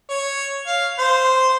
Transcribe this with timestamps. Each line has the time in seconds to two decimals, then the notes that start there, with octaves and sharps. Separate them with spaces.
0.09 C#5
0.66 F5
0.99 C5